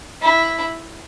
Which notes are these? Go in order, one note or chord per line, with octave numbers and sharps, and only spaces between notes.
E4